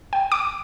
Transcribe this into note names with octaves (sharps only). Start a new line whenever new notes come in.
G5
D6